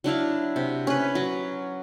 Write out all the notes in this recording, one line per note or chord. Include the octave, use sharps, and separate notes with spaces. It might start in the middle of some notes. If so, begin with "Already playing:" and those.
F#3 D4 E4 F5
C3
C#4 B4
F#3